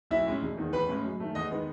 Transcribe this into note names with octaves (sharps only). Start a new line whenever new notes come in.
B1 E4 E5
A2 G#3 C#4
E1
E2 D#3
A1 B4 B5
A2 G#3 C#4
F#2
D#3 A3
E2 D#5 D#6
D#3 G#3 B3